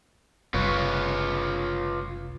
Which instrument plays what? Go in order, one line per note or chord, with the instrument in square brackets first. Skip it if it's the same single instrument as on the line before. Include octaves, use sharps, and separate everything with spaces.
[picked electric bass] F#1 C2 [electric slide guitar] F4 B4 C#5